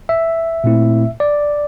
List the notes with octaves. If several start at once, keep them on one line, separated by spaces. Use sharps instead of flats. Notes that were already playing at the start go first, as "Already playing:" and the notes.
E5
A#2 A3 C4 E4
D5